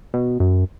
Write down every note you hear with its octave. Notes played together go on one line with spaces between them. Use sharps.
B2
F#2